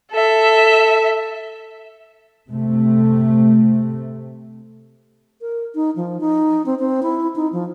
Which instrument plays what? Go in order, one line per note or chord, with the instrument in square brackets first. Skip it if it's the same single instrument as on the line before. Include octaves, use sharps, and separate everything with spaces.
[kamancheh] A4 E5
[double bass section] C3 A3
[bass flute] A#4
D#4
F3
D#4
C4
C4
E4
D#4
F3